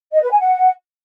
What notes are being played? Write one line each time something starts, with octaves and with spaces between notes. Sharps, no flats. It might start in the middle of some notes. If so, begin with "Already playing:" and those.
D#5
B4
G#5
F#5